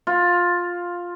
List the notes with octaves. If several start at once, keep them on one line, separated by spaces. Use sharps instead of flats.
F4